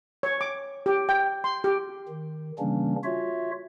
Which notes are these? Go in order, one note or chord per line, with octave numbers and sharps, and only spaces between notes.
C#5
D6
G4
G5
C6
G4
D#3
C#3 E3 G3 A#3 C#4 D4
F4 F#4 C#5 E5